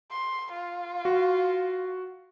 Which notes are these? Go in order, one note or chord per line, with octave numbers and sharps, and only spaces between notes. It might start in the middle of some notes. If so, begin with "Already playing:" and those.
C6
F4
F#4